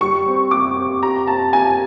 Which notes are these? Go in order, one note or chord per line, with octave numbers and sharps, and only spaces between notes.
G3 C#6
C4
G4 D6
C4
G4 A#5
C4 A5
G4 G#5